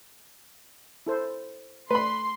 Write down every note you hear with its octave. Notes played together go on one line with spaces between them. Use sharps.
E4 A4 C5
A3 B4 B5 C6